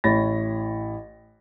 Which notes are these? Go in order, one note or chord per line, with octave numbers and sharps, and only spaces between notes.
A1 E4 C#5 B5 A6 A#6